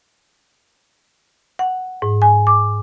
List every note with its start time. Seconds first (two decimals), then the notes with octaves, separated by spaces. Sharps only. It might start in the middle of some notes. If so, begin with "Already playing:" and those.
1.59 F#5
2.02 G#2
2.22 G#5
2.47 D6